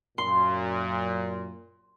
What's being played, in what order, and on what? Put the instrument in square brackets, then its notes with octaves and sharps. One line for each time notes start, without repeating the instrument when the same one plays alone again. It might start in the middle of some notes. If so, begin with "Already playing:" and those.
[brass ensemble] F#2 A#2 [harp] C6